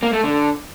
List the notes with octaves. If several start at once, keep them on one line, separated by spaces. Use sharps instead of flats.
A#3
A3
D3